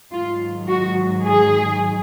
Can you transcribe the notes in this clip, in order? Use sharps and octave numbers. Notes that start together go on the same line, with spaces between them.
G#2 D#3 F#3 F4
F#4
G#4